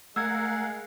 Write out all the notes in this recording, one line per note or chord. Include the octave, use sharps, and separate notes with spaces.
G#3 A3 A#4 F5 F#5 E6 G#6